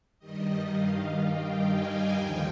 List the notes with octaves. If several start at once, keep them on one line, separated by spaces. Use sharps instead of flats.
G2 D#3 G3 D#5
F5
G5
G#5
D#2 D3 F3 G5